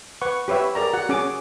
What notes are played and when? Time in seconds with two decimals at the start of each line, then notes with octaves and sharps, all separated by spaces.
0.22 B4 F#5 C#6
0.48 G4 B4 C#5 E5
0.75 G#4 A#4 D5 A#5
0.94 F#4 F#5
1.09 C#4 G#4 G#5 D6